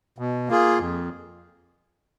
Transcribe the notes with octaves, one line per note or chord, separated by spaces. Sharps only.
B2
A#3 F4 G#4
F2